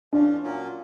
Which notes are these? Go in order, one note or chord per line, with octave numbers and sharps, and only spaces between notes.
E3 A3 C#4 D4 F4
A#2 F#3 A#3 C#4 F4